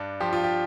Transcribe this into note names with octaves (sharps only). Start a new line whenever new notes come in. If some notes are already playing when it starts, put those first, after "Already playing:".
Already playing: G2 D4
F3 G4
F4
G4